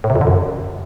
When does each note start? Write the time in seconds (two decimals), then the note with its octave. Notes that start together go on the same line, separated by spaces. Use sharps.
0.04 A2
0.10 C3
0.16 F2
0.21 D3
0.27 F#2